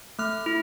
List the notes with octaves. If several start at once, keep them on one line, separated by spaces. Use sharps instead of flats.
A3 F6
E4